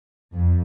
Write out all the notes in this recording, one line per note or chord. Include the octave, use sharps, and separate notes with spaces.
F2